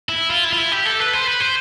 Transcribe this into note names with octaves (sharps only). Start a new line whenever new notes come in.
E4
F4
E4
F4
E4
G4
A4
B4
C5
B4
C5